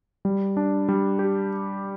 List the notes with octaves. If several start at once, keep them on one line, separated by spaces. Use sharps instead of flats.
G3
D4
G3
G4